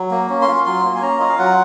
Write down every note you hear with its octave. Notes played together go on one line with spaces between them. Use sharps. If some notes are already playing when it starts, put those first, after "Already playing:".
Already playing: F#3
A#3
C#4
C6
F4
F#3 C6
A#3
G#5
C#4 A#5
F4 D#5
F5
F#3 F#5